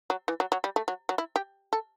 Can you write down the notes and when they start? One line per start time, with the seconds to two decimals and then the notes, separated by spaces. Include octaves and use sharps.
0.10 F#3
0.28 E3
0.40 F#3
0.52 F#3
0.64 G3
0.76 A3
0.88 F#3
1.09 F#3
1.18 E4
1.36 G4
1.73 A4